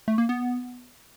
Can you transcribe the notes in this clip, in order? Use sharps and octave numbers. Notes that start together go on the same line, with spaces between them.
A3
A#3
B3